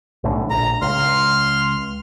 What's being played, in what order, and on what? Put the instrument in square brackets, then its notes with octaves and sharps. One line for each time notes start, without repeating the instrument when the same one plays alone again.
[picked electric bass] B1 A2 D3
[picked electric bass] A#1 [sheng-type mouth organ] A#5
[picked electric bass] C#2 [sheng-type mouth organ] C6 F6